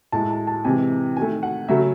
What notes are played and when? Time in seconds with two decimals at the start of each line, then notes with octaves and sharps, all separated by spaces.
0.12 A2 G#3 A5
0.31 A5
0.47 A5
0.65 C3 E3 G#3 G#5
1.17 D#3 A3 G#5
1.43 F#5
1.68 C#3 F#3 A3 E5